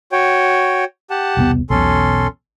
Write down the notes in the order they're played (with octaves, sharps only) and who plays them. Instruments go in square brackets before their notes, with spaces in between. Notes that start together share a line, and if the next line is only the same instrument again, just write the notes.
[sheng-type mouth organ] F#4 C#5 G5
G4 F#5 A5
[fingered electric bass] E1 C2 B3
[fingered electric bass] B1 E2 B2 [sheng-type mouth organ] C#4 A4 C6